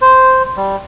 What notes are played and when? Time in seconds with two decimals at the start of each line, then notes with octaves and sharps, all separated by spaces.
0.01 C5
0.57 G3